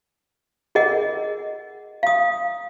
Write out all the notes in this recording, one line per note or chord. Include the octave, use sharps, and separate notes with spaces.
G#4 A#4 D#5 F#5
F5 D#6